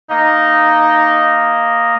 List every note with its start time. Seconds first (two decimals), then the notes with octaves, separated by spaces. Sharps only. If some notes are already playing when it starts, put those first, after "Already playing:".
0.10 A#3 D#4 D#5